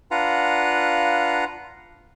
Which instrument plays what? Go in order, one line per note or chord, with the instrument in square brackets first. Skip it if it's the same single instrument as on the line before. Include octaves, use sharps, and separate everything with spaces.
[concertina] D4 F4 B4 F5 F#5 A#5